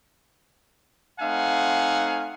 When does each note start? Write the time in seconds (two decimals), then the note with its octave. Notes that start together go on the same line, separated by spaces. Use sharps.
1.19 A3 C4 D#4 F5 F#5 G#5